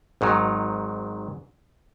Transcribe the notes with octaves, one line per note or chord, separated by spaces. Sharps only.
G#1 G#2 D#3 F#3